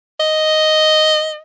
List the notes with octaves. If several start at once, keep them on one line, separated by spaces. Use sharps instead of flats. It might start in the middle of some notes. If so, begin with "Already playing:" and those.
D#5